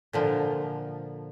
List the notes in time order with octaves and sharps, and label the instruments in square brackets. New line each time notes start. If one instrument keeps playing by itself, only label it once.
[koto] A#2 D3 F3